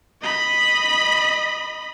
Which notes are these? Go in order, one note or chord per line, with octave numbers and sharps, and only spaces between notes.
D#5 B5